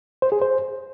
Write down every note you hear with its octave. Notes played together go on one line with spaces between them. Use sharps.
C5
G#4
C5